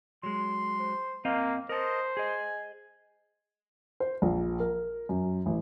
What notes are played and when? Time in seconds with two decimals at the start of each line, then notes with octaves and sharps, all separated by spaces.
0.23 F#3 G#3 C6
0.79 C5
1.25 A#3 C4 D#5 F5
1.69 A#4 C5 D#5 A5
2.17 G#4 D#5 G#5
4.00 C5
4.22 A#1
4.60 A#4
5.09 F#2
5.46 A1